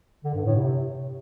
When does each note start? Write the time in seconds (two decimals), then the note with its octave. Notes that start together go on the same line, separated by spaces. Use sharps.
0.24 D3
0.35 G2
0.45 A2
0.56 C3